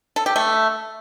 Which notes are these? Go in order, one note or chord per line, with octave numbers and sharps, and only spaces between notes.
A4
G4
A3